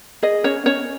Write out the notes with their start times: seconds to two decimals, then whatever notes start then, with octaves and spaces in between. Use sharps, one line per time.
0.23 G#4 D#5
0.44 C#4 C#5
0.66 C#4 C#5